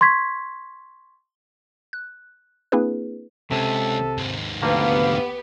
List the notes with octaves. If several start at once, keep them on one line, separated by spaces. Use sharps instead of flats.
C6 C#6 G#6 B6
F#6
A#3 C4 D4 E4 G#4 B4
C#2 C3 A4
D#2 G#2
D2 F3 A#3 B3 G4 F5